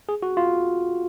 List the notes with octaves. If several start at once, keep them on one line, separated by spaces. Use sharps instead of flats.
G#4
F#4
F4